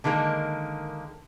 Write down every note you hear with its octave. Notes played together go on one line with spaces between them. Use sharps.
D3 D#3 G#3 A#3